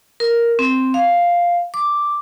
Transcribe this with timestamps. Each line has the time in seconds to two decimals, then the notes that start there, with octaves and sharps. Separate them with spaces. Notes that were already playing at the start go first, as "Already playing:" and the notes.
0.20 A#4
0.59 C4
0.94 F5
1.74 D6